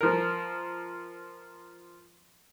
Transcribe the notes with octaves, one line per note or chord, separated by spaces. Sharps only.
F3 A#4